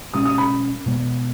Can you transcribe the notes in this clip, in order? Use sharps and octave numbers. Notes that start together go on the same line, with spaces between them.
B2 G#3 C#4 D#6
D#6
B5
B2 G#3 B3